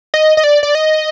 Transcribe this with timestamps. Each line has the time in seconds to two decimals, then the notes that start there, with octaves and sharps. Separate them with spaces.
0.14 D#5
0.37 D#5
0.44 D5
0.63 D5
0.75 D#5